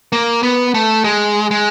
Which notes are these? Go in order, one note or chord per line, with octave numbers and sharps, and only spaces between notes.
A#3
B3
A3
G#3
G#3